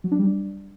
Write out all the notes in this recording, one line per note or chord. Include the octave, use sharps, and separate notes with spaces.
F#3
D4
G3
D4